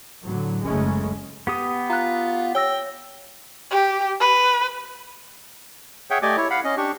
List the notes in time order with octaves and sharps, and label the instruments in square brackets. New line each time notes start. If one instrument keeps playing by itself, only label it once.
[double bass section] A2 D3 F#3
F#1 F#2 C#3 G#3 A3 C#4
[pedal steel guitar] B3 G4 D#6
[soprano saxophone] F4 [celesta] A#5 F#6
[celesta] C#5 E6 A#6 [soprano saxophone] G5
[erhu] G4
B4
[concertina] G#4 C#5 E5 F#5 G5
A3 G4 D5 D#5 G#5 D6
E4 C#5
F5 F#5 B5
C#4 D#5
D4 G4 C#6